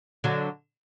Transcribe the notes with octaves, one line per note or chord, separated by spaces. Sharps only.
D3 F#3